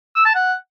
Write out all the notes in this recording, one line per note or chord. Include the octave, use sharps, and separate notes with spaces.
E6
A5
F#5